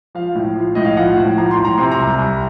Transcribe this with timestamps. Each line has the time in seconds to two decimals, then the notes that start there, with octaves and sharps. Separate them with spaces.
0.15 F3 F5
0.35 A2
0.56 F3
0.75 A2 D#5
0.85 F5
0.96 F3 F#5
1.17 A2
1.37 F3 A#5
1.51 C6
1.58 A2
1.65 A#5
1.78 C3 C6
1.91 A#5
1.99 C2
2.18 C2